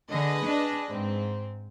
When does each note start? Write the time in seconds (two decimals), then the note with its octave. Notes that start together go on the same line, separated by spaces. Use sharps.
0.11 D3 G#4 B4 D#5
0.46 D4
0.91 G#2 C4